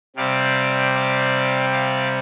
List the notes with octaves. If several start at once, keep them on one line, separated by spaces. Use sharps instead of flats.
C3 G3 C4 D5 F5
D5 F5
D5 F5